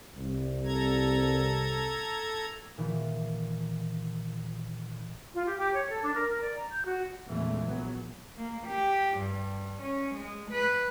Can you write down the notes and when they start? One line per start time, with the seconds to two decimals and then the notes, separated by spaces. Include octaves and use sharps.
0.15 C2
0.65 A4 A#5 G#6
2.78 A#2 D#3 E3
5.34 F4
5.46 G4
5.57 G4
5.74 C#5
5.89 A4
6.02 D4
6.15 A#4
6.28 A#4
6.41 D5
6.56 A#5
6.70 G6
6.85 F#4
7.28 E2 A#2 C#3 E3 G#3 A3
7.62 A#1 F#3 B3
8.36 A#3
8.67 G4
9.16 G2
9.81 C#4
10.15 G#3
10.50 B4